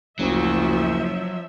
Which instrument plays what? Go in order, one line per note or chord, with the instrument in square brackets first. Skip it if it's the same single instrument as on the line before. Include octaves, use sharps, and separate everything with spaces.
[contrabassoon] F#1 [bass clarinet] D2 [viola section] F3 E5 [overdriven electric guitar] F#3